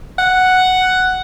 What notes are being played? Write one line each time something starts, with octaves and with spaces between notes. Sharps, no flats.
F#5